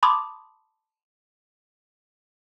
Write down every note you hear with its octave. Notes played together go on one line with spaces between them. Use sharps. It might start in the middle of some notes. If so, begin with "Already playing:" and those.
A5 B5 C6 D6 D#6